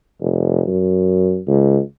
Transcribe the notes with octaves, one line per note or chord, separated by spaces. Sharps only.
F1
F#2
C#2